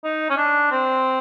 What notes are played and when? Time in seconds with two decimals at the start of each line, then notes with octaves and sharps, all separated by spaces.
0.04 D#4
0.30 C#4
0.37 D4
0.71 C4